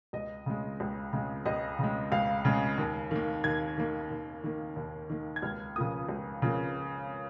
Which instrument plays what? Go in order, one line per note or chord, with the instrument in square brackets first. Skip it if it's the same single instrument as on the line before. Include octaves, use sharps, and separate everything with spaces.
[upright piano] C#2 D#5
C#3 G#3
C#2
C#3 G#3
C#2 D#5
C#3 G#3
C#2 F5
C#3 G#3
D#2
D#3 A#3
D#2 G#6
D#3 A#3
D#2
D#3 A#3
D#2
D#3 A#3
G#6
C#2 F6
C#3 F3 A#3 D#6
C#2
C#3 F3 A#3